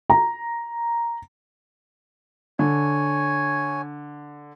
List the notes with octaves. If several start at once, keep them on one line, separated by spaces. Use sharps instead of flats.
A#5
D3 C#5 G#5